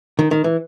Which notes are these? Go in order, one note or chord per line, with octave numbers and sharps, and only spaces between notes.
D#3
D#3
E3